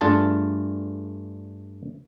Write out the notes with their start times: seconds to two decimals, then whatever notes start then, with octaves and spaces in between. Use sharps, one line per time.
0.01 G2 A3 D4 F4 G#4 A5